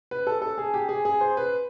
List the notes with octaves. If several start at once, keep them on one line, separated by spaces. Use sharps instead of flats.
B4
A4
A4
G#4
G4
G#4
G#4
C5
B4